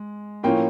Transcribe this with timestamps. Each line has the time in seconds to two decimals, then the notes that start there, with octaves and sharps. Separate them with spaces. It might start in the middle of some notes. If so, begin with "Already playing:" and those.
Already playing: G#3
0.43 A2 F3 A#3 C#4 F4 G5